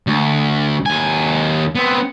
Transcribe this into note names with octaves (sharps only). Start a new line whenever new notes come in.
D2
D#2 G#5
B3 C4